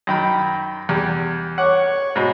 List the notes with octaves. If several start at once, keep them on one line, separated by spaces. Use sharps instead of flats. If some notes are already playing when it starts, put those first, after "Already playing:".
F#2 D#3 B5
E2 G3
C#5 F#5 D6
G#2 B2